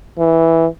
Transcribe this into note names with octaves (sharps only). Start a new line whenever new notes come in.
E3